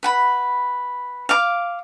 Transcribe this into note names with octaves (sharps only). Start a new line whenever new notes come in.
B4 F#5 B5
F5 D6